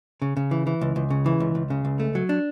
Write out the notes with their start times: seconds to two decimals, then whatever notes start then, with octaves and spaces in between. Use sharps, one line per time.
0.22 C#3
0.37 C#3
0.51 E3
0.67 E3
0.81 C#2
0.96 C#2
1.10 C#3
1.26 E3
1.40 C#2
1.55 C#2
1.70 C#3
1.85 C#2
2.00 A3
2.15 F#3
2.29 D4